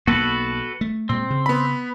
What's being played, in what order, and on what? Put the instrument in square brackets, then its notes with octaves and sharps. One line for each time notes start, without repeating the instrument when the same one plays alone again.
[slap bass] B1 A#3 B3 [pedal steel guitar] F#4 A4 B4
[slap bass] A3
[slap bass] A#2 G#3 [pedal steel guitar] C4
[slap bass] C#3
[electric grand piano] B3 B5